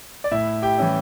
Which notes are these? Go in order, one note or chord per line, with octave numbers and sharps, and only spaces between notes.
D5
A2 E4 E5
G4 G5
E3 G3 C#4 E4